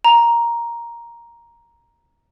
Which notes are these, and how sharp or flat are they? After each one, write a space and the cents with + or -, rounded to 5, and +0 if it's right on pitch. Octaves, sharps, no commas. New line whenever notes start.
A#5 +5